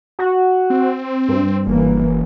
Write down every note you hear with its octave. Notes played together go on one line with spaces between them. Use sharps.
F#4
C4
G2
F#1 E3 A#3